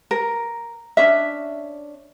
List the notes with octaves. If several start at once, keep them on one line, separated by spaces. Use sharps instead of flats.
A#4
C#4 D4 E5